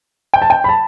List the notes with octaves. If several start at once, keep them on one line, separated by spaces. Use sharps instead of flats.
G5
A5
G5
B5
A5